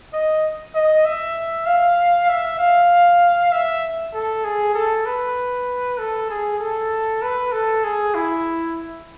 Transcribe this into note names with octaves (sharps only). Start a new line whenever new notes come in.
D#5
D#5
E5
F5
E5
F5
E5
A4
G#4
A4
B4
A4
G#4
A4
B4
A4
G#4
E4